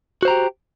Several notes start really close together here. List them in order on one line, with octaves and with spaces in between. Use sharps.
F#4 C5 A#5 G4